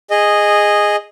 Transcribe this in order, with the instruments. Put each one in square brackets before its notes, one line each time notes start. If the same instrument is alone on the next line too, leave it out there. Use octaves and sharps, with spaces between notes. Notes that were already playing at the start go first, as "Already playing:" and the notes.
[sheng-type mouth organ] G#4 D#5